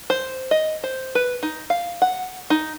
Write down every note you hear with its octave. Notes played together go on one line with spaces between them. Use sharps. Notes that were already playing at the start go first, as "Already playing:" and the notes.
C5
D#5
C5
B4
D#4
F5
F#5
D#4